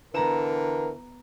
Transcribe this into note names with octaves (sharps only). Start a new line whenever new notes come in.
D3 E3 B3 A#4 A#5 E7